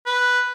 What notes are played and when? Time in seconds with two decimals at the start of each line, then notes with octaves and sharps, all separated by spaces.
0.06 B4